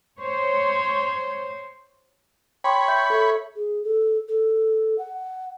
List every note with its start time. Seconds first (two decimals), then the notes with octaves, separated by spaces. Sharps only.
0.19 C5 C#5
2.64 C#5 G5 B5 C6 D6
2.88 E5 G6
3.10 A4 E5
3.55 G#4
3.84 A4
4.28 A4
4.98 F#5